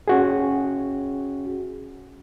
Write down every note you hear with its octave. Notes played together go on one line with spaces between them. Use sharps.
C#4 F#4 G#4